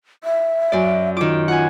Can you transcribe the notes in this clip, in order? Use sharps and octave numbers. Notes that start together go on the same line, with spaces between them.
E5
F#2 D5
D#3 F4 D6
F4 F#5 G#5